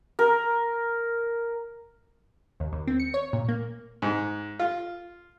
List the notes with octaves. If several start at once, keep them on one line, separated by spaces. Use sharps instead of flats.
A#4
D#2
D#2
C4
C#7
C#5
A#2
A#3
G#2
F4